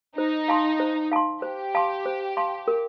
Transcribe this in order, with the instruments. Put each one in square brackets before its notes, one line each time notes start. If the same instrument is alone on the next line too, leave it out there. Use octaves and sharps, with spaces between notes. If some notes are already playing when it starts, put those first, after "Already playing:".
[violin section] D#4 [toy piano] C5
[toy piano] F5 A5 C6
C5
F5 A5 C6
[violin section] G4 [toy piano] C5
[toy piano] F5 A5 C6
C5
F5 A5 C6
A#4